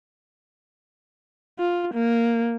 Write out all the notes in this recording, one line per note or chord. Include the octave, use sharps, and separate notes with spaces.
F4
A#3